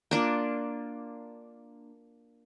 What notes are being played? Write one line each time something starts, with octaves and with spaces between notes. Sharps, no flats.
A#3 D4 F4